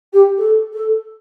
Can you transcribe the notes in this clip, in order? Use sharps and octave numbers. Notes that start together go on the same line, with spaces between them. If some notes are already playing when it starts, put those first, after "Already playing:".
G4
A4
A4